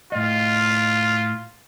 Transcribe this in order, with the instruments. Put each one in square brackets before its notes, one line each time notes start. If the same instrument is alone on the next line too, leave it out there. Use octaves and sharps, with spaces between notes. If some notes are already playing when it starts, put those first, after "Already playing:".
[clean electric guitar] A2 D#5 [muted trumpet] F4